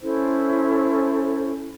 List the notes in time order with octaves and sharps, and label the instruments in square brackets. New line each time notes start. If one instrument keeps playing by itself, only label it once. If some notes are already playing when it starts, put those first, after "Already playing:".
[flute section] C#4 E4 A4 C5